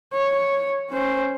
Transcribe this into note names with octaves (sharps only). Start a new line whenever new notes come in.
C#5
C#4 C5